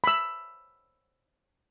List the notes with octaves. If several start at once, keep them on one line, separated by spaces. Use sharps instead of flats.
B5 E6